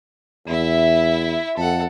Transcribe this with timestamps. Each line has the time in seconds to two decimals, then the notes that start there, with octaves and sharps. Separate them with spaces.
0.47 E2 E4 E5
1.57 F2 A4 F#5